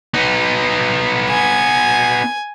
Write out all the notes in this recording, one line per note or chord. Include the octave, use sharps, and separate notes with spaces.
B3 D#4
G#5